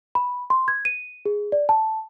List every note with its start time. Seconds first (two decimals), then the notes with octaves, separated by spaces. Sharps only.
0.15 B5
0.50 C6
0.68 G#6
0.85 D#7
1.25 G#4
1.52 D5
1.69 A5